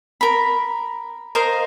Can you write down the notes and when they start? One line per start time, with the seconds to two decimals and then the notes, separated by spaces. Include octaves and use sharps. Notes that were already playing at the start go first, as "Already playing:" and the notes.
0.21 A#4 B5
1.35 A#4 C5 D#5 F5